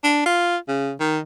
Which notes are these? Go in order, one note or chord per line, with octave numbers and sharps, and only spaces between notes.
D4
F4
C#3
D#3